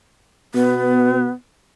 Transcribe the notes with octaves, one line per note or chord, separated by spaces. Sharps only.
B2 B3